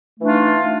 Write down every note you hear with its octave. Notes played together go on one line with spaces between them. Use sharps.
E3 A3 D4 D#4 F4